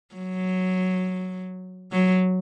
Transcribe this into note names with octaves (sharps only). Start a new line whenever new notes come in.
F#3
F#3